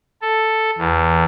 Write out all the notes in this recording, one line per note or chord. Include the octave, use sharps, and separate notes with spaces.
A4
E2